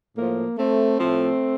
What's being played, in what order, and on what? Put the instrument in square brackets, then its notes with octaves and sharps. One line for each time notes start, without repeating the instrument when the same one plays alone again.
[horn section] A2 F3 A#3
A3 C4
A2 F3 A3 C4